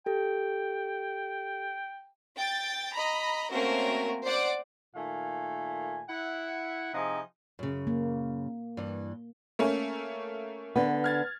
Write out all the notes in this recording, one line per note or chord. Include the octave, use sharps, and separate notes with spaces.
G4 A4 G5
G5 A6
D#5 A#5 B5
A3 A#3 C4 C#4 F#4 A#4
C5 D5 F#5 D6
A#2 D#3 A3 F5 G#5
E4 F#5
C3 F3 D#4 E4 G#4
F#2 C#3
A#3
G2 E3
A3 A#3 C#4
D3 B3
F6 G#6 A6